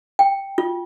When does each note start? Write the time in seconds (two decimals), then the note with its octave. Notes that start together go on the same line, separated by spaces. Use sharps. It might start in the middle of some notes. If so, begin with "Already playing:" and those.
0.19 G5
0.58 F4